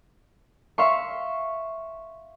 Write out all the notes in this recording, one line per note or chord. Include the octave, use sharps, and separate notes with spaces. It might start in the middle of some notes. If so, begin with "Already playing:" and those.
E5 F5 C6 C#6